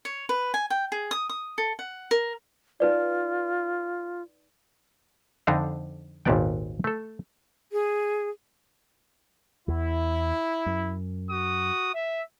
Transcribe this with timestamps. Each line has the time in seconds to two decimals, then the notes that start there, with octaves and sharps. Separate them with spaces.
0.05 C#5
0.29 B4
0.54 G#5
0.70 G5
0.92 G#4
1.11 D#6
1.30 D#6
1.58 A4
1.79 F#5
2.11 A#4
2.80 D#4 F4 B4 D5
5.47 F2 D3 D4 D#4 C5 A#5
6.25 G#1 D#2 A#2 B3 D5 G5
6.84 A3 A4
7.72 G#4
9.68 E2 E3 E4
10.66 F#2
11.30 F#4 D#6
11.94 E5